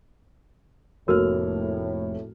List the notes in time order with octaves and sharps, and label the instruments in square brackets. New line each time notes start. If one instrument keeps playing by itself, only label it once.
[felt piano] F1 A#3 F6 [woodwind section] A2 [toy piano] F#4 A#4